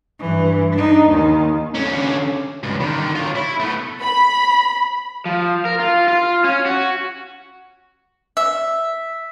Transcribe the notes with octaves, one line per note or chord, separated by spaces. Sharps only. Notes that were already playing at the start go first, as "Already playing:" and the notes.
G2 E3
D4 D#4
D#2 D#3
D3 C#4
C#2 G2
D3 D#3
F4 C#5
E4
A3 B3
B5
F3
A#4
F4
F4
C#4
F#4
E5